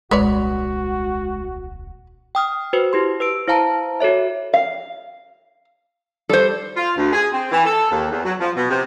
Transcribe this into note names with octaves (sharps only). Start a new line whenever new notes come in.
D#1 C2 G#3 F#4 B4 C#5 D5
G5 D#6 F6
F#4 B4 C5
E4 G4 C6
B4 E6 D7
E4 C5 F5 A5 A#5
F#4 A4 C#5 E5
F5
G3 A4 C5
F4
D2
G#4
C4
E3
A4
D#2
E2
F#3
F3
B2
C3